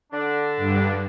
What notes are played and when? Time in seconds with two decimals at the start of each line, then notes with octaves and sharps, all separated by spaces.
0.13 D3 D4
0.57 G2